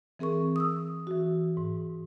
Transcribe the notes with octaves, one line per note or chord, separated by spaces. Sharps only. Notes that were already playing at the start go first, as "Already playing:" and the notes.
E3 C4 G#4 A#4 C#6
D#6 E6
E3 F#4
G#2